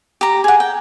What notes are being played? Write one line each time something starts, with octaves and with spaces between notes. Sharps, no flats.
G4 A#5
G#4 F#5
G5